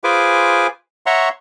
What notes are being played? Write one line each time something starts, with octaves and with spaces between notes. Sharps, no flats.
F4 G#4 B4 C5 G#5 D6
C#5 E5 F#5 A#5 C6 C#6